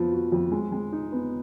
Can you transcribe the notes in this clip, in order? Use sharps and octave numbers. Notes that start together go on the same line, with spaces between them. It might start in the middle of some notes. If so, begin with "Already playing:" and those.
Already playing: F2 F3 B3
F#4
F2
G#3
G#3
D#4
B3